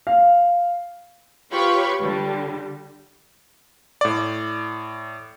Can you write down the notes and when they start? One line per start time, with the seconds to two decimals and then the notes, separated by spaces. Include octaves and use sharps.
0.07 F5
1.51 F4 G4 B4 C#5 B5 C#6
2.01 D3 G3
4.01 A2 D5